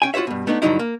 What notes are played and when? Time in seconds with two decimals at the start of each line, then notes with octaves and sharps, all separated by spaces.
0.02 C#4 G5 G#5
0.14 F4 F#4 C5 C#5 E5
0.27 G2 B2
0.47 A3 B3 D4 D#4
0.62 G2 A#2 D3 F#3 D#4 E4
0.79 A#3